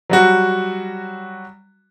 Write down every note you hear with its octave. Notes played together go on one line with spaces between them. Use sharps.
F#3 G3 F#4